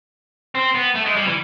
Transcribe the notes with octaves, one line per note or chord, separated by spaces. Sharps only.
C4
B3
A3
G#3
G3
E3